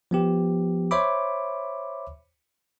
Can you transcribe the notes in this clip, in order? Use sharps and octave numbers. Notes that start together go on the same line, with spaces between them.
F3 B3 G4
C5 C#5 E5 B5 D6